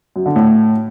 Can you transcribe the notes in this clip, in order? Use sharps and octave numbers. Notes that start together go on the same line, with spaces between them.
F#2
D3
A2